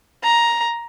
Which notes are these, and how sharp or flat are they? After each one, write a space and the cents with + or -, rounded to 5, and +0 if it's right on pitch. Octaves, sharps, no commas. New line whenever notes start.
A#5 +10